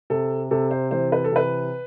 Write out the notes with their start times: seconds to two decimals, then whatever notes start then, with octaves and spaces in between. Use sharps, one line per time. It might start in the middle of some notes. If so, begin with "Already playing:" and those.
0.10 C3 A4
0.51 C3 A4
0.71 C5
0.91 E3 C5
1.12 B4
1.24 A4
1.32 C3 B4